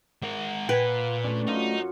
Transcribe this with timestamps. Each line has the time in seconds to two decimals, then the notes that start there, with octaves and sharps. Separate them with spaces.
0.22 G#3 A#4 F#5
0.69 A#2 B4 G5 G#5
0.87 F4
1.24 A3 C#4 D4
1.47 F#2 D#4 F4